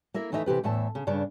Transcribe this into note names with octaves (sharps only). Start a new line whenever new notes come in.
A#3 E4 A#4 E5
D#2 E3 A3 D#4 D#5 E5
C3 E3 G4 B4
E2 A2 E3 E5 A5
C#3
G2 C#3 D4